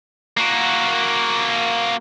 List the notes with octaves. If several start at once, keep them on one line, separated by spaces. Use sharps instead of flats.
A#3 F#4